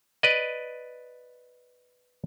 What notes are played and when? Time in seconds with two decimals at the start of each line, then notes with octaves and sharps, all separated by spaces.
0.23 B4 D5 D#5